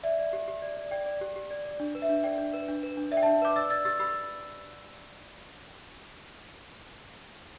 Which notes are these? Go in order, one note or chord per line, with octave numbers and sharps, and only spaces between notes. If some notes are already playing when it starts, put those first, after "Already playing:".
D5 E5
D5
G4
G4
D5
D5
D5 G5
D5
G4
G4
D5
D5
D4
B4
E5
D4
D5 G5
D4
B4
D4
B4
D4
D5 E5
G5
E5 A5
D4
B4 D6 G6
D5 E6 A6
D5 E6 A6
G4 E6 A6
G4 B5 E6